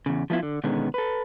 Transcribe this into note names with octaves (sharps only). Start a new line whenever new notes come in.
E2 C#3
F3 A3 B3 E4 F4
D3
B2 D3 D#3 G#3 B3 C#4
A4 B4